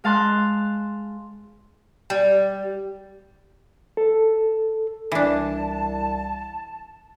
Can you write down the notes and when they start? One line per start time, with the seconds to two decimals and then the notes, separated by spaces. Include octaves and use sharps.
0.04 G#3 F5 A5 C6 F#6
2.10 G3
3.97 A4
5.12 C2 E3 D4 A5